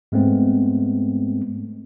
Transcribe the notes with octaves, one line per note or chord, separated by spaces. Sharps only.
G#2 G#3 A3 B3 C4